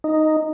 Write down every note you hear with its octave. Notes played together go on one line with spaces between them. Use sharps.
D#4